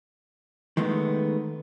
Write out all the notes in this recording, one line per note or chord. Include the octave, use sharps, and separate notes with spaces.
D#3 G#3 A3 B3